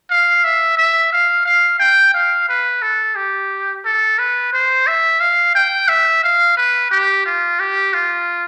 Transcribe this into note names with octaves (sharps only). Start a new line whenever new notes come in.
F5
E5
E5
F5
F5
G5
F5
B4
A4
G4
A4
B4
C5
E5
F5
G5
E5
F5
B4
G4
F4
G4
F4